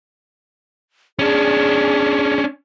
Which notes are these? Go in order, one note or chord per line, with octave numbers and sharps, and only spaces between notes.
C#4 D4 G#4